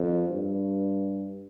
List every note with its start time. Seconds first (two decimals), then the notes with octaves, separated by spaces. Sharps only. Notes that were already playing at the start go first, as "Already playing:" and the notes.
Already playing: F2
0.30 G2